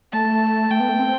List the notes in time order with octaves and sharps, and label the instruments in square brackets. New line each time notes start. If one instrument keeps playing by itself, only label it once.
[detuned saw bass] A3 [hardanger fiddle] A5
[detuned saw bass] A3 [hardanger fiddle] G5
[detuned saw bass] B3
A3
C4